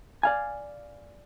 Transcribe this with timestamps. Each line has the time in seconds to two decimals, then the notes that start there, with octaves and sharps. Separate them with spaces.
0.23 D5 F5 G#5